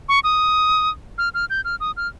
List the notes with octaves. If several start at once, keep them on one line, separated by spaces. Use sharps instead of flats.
C#6
D#6
F6
F6
G6
F6
D#6
F6